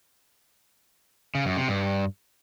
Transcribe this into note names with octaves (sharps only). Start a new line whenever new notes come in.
C#3
F#2
C3
G2